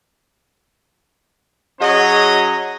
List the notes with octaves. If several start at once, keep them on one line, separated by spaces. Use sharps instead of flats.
F#3 C#4 F#4 G#4 C#5 D#5